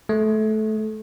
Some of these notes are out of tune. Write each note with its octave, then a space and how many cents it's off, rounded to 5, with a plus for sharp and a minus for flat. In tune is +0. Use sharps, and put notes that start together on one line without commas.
A3 -20